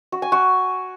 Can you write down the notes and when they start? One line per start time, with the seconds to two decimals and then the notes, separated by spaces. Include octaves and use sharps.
0.12 F#4
0.22 G#5
0.32 F#4